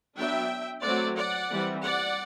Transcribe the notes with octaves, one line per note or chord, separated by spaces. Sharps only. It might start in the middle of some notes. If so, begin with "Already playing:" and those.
F#3 B3 D4 E5 G5
F#3 A3 C4 D5 F#5
D5 F#5
E3 G3 C4
D5 F#5